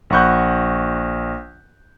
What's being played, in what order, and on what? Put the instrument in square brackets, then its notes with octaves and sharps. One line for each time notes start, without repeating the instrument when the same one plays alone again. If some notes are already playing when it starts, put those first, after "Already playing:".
[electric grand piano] A#1 F#5 B5 C#6 F#6 G6